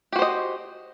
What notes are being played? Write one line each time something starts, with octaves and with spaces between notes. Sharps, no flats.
F#4 G4 C5 D#5